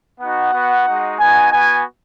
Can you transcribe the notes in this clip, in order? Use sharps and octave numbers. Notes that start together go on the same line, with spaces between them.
B3 D#4 F#4 F#5
B3 F#4
G#3 D#4 F#4
B3 D#4 F#4 G#5
B3 F#4 G#5